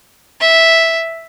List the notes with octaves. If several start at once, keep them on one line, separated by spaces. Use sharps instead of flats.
E5